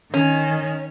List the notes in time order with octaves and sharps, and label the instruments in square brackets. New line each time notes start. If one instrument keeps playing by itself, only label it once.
[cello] D#3 [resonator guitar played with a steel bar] C#4